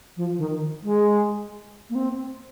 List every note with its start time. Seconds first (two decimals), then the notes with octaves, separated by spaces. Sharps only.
0.17 F3
0.38 D#3
0.83 G#3
1.90 A#3
1.95 C4